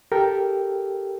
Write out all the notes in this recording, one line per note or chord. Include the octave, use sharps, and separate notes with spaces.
G4 A4 A#4 G5